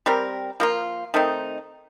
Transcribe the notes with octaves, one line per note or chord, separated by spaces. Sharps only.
G3 C4 G4 A#4
F3 A#3 F4
D#3 A3 C4 D#4